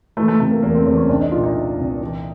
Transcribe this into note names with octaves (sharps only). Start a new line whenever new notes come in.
E3 A3
A3
C3 A3
A#3
E2 A#3
C4
E2 C4
C#4
C2 D4
D#4
A#2 F4
D#4
A#2
C2
E3